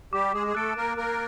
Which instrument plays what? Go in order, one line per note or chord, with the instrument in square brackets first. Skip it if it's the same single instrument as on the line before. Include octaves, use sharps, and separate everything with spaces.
[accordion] G3 G4 [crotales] D6
[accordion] G#3 G#4
G#4
[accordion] A3 A4 [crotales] F#6 A6 D7
[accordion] A#3 A#4
[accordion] A#3 A#4 [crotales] D6